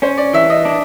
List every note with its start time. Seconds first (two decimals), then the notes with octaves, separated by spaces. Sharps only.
0.02 C#4 C5
0.18 D5
0.33 E3 E5
0.50 D#5
0.65 D4